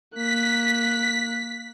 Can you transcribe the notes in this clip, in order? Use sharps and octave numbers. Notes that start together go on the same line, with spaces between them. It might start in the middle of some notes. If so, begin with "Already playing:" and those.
A#3 F#6 B6